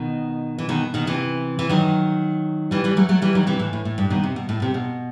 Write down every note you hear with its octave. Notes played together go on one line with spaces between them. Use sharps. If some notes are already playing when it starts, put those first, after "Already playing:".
Already playing: B2 D#3
E3
B2 D#3
B2 D#3
C3 E3
E3
D#3 F#3
E3 G3
E3 G3
F#3 A3
F#3 A3
E3 G3
D#3 F#3
C3 E3
A2
A2
A2
G2
B2 D#3
C3
B2
A2
C3
B2